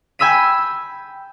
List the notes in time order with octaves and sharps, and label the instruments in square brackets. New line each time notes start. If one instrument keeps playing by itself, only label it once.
[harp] G5 G#5 B5 E6 B6 D#7